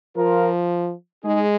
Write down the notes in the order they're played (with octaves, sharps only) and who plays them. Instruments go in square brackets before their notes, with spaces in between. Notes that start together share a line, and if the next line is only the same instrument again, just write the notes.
[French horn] F3 [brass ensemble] F4 A#4
[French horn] G#3 [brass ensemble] D#4 G#4